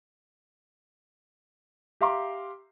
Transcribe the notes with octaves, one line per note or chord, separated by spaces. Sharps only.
G4 E5 F5 A#5 C6 D6